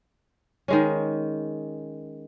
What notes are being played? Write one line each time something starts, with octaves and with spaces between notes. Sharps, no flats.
D#3 G#3 C#4